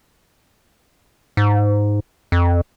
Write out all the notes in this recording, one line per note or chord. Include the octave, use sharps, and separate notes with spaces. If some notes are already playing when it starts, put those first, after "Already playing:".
G#2
F2